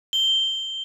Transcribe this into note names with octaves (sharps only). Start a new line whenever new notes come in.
G7